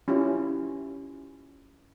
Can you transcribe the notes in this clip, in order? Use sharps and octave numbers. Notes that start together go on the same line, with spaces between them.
C#4 E4 F4 G4